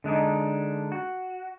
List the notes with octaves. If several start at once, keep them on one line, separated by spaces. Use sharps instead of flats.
D3 G#3 D4 D#4
F#4